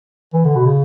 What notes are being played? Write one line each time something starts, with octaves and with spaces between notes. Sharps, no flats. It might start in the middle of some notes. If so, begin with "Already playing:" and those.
E3
D3
B2
C#3